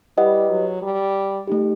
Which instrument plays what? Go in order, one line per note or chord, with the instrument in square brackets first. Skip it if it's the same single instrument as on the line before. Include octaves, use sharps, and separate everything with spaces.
[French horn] G3 [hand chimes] E4 G4 B4 D#5 F#5
[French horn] F#3
G3
[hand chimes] A3 D#4 G4